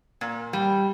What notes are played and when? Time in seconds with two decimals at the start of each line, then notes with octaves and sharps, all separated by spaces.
0.21 A#2
0.53 G3